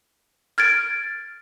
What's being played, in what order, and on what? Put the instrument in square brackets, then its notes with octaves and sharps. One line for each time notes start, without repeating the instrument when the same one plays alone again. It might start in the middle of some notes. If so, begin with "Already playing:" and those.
[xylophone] F6 G#6 A6 D7